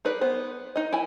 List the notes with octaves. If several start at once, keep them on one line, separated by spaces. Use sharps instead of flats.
D#4 G#4 B4 D5
B3 C5
D#4 D#5
E4 G#5